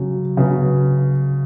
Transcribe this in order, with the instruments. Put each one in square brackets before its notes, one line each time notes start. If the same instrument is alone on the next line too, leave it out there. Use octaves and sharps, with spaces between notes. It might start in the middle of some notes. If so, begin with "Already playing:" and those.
Already playing: [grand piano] C#3 F#3
C#3 F#3 B3